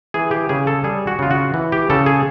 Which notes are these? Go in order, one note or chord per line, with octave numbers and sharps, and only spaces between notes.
E3 G#4
G4
C#3 G#4
A4
G3 G#4
F#4
C#3 F4
F#4
E3
G4
C#3 A4
G#4